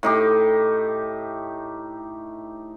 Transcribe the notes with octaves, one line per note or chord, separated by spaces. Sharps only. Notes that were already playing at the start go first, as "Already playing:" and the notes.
A2 D#4 G4